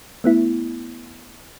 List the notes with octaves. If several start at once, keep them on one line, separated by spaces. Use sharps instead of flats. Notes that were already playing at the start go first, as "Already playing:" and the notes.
A3 B3 E4